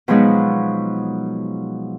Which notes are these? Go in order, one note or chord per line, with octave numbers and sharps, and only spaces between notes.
B2 F3 F#3 G#3 B3 D#4